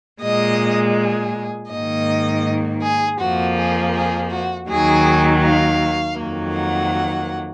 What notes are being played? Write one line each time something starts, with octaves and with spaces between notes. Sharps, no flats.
A#2 G#3 D#5
G#4
G#2 D#3 A#3 D#5
G#4
F2 F3 A#3 F#4
G#4
G#4
F#4
D#2 D#3 F#3 G#4
F5
F2 D#3 F#3 A#3
F#5